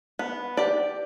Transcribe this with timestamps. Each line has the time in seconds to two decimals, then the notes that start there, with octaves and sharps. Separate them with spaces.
0.19 B3
0.57 G4 D5